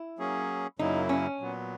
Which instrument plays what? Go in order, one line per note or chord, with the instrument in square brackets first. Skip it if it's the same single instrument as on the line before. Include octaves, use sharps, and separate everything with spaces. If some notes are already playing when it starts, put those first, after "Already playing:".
Already playing: [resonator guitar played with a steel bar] E4
[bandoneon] F#3 A#3 C#4 G#4
[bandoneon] F#2 C#3 F#3 A#3 E4 [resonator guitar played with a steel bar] D#4
[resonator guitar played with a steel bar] C#4
[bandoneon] A#2 F#3 B3